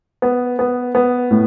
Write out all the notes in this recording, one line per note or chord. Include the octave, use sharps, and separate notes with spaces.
B3
B3
B3
A2